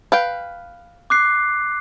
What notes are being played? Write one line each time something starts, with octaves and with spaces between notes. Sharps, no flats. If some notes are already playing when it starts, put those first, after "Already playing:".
B4 F5 G5
D6 F#6 C7